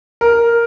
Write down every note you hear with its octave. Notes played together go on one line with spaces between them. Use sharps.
A#4